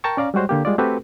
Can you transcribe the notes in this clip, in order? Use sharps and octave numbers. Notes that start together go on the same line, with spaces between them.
A#4 G5 A5 A#5 C#6
C#4 D5 F5 A#5
G3 G#3 F#4 C5 C#5
D3 A#3 G4
G3 G#3 F4 D5
A3 C4 F#4 G4 A4 B4